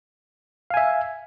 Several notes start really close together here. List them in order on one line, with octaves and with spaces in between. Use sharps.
F5 G#5 E5